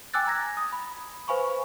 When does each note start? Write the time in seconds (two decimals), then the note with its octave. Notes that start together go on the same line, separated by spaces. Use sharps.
0.14 G5 G#5 D6 E6 F#6 A6
0.27 A#5 G#6 A#6
0.57 D#6
0.73 B5
1.28 B4 C5 F5 G#5 B5 C#6